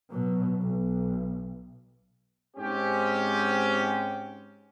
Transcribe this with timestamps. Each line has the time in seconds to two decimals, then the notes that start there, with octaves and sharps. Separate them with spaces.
0.10 B2 F#3
0.61 B1
2.57 G#2 C4 C#4 G4